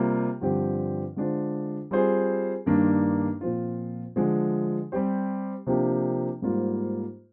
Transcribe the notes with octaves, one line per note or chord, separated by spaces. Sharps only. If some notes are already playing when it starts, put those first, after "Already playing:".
Already playing: C3 G3 A#3 F4
G2 D3 F3 C4 G4
D3 G#3 D4 F4 C5
G3 C4 F4 G#4 C5
G2 D#3 A#3 D4
A#2 F3 C4 F4
D3 F3 G#3
G3 C4 G4 C5
C3 F3 A#3 D4 G4
G#2 G3 A#3 F4 C5